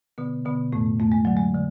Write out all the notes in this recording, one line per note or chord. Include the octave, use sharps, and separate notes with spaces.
B2 D3 B3
B2 D3 B3
F2 A2 A3
F2 A3
G#3
D3 F#3
G#3
D3